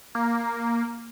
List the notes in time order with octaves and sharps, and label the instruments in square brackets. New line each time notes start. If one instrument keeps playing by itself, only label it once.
[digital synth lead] A#3